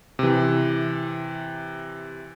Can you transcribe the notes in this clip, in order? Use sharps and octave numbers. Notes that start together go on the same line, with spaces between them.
C3 E3